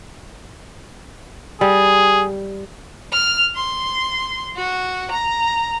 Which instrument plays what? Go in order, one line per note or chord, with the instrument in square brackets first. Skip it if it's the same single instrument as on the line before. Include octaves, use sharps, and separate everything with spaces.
[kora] G3 [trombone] G#4
[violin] F6
C6
F#4
A#5